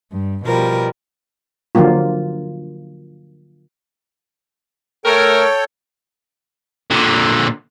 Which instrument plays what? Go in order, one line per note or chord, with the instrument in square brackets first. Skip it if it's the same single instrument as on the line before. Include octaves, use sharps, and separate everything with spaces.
[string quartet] G2
B2 F3 G3 A#4
[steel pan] D3 F3 F#3 A#3 F4
[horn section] A3 A#4 [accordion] A4 C#5 G5
[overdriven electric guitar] A#2 D3